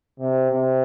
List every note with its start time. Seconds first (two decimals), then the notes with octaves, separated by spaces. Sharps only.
0.19 C3
0.50 C3